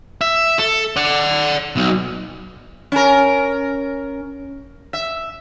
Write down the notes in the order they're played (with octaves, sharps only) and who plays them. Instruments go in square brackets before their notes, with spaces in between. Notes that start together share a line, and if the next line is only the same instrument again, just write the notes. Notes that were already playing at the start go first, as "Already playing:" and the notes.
[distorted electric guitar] E5
A4
D5 F#5
B1
[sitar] C#4 A#4
E5